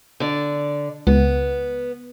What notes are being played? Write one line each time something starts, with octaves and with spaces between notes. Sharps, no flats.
D3 D5
C#2 B3